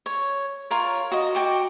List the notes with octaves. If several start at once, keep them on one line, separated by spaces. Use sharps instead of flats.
C#5
F4 A#4 C#5
F#4 D#5
F#4 G5 D6